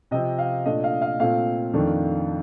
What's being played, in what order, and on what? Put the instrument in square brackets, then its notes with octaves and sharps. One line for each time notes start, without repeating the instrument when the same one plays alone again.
[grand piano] C3 F3 C4 D#5
F5
A#2 A3 D4 D#5
F5
F5
A#2 A3 C4 F5
F2 D#3 A3 D4